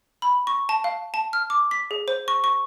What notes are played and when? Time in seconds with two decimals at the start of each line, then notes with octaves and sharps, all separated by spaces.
0.22 B5
0.47 C#6
0.69 A5
0.84 F5
1.14 A5
1.33 F6
1.50 D6
1.71 B6
1.91 G#4
2.08 C5
2.28 C#6
2.44 C#6